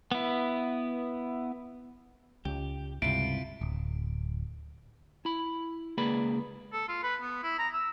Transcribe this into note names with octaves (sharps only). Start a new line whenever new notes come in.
B3 E4
C#2 G4
C#2 G2 C3 E4 F4 D7
D1
E4 B5
C#2 A#3 G#4 B4 D5 B5
A4
F4
B4
B3
E4
A#5
E6